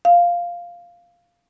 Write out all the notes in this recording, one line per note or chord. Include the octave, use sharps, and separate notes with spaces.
F5